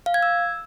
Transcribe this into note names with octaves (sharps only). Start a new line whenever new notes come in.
F5
G#6
E6